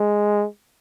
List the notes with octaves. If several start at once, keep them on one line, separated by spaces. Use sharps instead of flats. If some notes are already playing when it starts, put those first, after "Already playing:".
Already playing: G#3